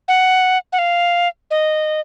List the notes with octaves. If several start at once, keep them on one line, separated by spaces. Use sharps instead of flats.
F#5
F#5
F5
D#5